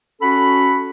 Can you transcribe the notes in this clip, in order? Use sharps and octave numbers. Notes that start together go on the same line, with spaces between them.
C#4 F#4 A4 F#5 B5